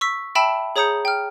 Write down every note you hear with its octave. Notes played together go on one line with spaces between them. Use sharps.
C#6 E6 B6
E5 G5 A5 B5 E6 E7
G#4 C#5 A#5 D#6 G6 C#7
G5 F6